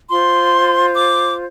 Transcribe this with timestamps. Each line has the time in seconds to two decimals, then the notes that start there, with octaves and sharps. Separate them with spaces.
0.10 F4 C5 C6
0.95 D6